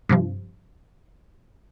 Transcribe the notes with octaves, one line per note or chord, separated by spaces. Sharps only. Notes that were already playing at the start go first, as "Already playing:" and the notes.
G2 C3 F3